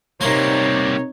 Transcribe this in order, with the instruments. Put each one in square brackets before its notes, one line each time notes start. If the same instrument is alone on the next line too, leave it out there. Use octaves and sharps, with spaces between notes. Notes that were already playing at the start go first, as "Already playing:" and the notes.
[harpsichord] C3 A#4 C5 [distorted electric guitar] G3 A#3 [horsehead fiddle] D#4 C#5